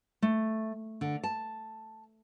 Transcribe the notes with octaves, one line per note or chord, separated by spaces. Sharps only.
A3
D3
A5